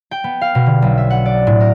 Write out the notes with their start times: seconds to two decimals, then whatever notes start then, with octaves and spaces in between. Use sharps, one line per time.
0.11 G5
0.24 B3
0.41 F5
0.55 B2
0.66 D3
0.82 B1
0.98 E5
1.10 F#5
1.25 D5
1.47 A2
1.60 A#4